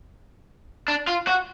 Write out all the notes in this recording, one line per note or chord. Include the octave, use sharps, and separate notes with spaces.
D4
F4
F#4